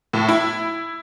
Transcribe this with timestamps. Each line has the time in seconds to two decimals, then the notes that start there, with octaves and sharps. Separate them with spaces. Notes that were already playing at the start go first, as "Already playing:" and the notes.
0.13 A2
0.28 E4